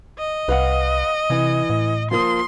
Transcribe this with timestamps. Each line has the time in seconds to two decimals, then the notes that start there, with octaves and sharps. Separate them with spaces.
0.19 D#5
0.48 C2 B4 F5 F#5
1.30 C3 E3
1.70 A2
2.11 F3 A#3 C6 D#6